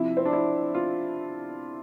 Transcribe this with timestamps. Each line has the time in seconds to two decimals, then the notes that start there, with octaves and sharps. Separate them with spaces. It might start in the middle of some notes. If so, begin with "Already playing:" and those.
Already playing: C3 F3 E4
0.17 C4
0.25 D4
0.33 E4
0.75 F4